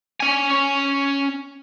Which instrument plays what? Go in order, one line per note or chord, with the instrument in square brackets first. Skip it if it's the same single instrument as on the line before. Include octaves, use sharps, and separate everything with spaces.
[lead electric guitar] C#4 G#5